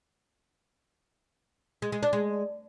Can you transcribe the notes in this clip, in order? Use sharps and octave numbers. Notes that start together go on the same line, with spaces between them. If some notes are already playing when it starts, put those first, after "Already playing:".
G#3
G#3
D4
G#3